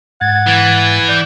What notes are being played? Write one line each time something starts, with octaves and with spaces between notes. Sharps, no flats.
G#2 F#5 G#6 A6
E3
D5 G6